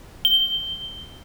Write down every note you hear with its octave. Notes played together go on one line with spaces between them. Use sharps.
G7